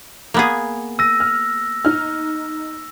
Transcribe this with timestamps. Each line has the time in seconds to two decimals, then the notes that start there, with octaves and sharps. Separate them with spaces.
0.34 A#3 B3 G#4
0.99 E6 A#6 D#7
1.20 F6
1.85 D#4 F6